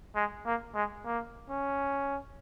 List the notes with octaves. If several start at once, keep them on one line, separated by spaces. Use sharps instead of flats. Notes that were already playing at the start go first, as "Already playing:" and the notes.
G#3
A#3
G#3
A#3
C#4